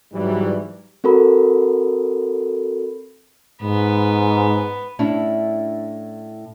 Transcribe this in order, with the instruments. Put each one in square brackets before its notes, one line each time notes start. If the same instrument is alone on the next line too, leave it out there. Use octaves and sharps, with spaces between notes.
[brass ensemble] G#2 E3 F#3 G3
[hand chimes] C4 F#4 A4 A#4 B5
[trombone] G#2 [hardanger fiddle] B3
[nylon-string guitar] A2 C#4 D4 E4